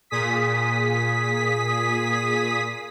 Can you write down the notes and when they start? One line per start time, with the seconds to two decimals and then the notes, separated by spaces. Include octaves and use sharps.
0.10 A#2 G#4 D#6 B6